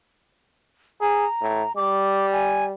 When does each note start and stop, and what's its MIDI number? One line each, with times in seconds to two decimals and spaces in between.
1.01 1.25 68
1.01 1.72 82
1.41 1.63 45
1.76 2.73 55
1.76 2.26 86
2.32 2.65 80